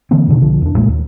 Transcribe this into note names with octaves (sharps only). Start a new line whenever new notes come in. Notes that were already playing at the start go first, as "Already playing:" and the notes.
D3 E3 A#3 C4
F#2 B2 D3 D#3
B1 D3 F3
E2 D4
A#1 A#2 G#3 A#3
D#2